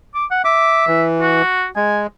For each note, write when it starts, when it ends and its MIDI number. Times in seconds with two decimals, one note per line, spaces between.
0.14 0.25 86
0.31 0.44 78
0.44 1.05 76
0.44 0.86 86
0.87 1.42 52
1.21 1.67 66
1.76 2.07 56
1.76 2.01 80